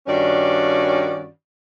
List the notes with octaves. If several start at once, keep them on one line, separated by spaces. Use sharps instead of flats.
G2 D#3 C#4 F#4 D5